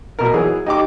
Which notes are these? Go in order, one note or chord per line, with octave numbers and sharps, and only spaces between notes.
B2 A#4
E3 F#3 G#4
D#4 G4 D6